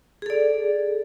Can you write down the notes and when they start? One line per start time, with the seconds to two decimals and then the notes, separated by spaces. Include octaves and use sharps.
0.22 G#4
0.26 A4
0.30 D5